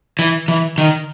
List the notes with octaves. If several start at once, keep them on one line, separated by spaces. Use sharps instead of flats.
E3
E3
D#3